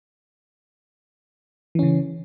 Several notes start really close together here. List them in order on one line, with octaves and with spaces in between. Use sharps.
E3 C#4 C#3